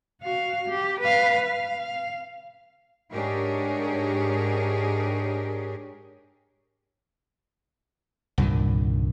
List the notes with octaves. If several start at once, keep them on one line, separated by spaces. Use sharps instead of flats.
F#4 F5
G4
B4 F5
F5
G#2 D4 G4 G#4 A#4 C#5
C2 G2 A#2 D#3